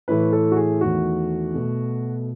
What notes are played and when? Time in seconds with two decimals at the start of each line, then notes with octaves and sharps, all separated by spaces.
0.08 A2 E3 A3 B4
0.33 A4
0.52 F#4
0.56 G#4
0.81 E2 D#3 A3 F#4
1.54 B2 A3